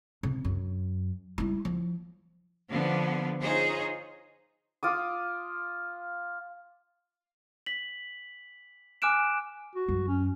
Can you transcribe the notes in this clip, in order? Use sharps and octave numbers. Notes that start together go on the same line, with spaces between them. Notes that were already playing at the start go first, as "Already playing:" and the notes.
C3
F#2
G3 E4
F3
D3 F3 B3
D#4 F4 G#4 C5 C#5
F4 D6 D#6
B6 F#7
G#5 D6 F6 F#6 D7 E7
F#4
F#2
C#4